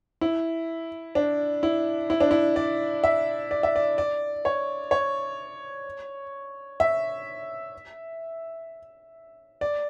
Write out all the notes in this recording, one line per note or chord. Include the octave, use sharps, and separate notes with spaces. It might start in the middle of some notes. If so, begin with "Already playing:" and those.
E4
D4
E4
E4
D4
E4
D5
E5
D5
E5
D5
D5
C#5
C#5
E5
D5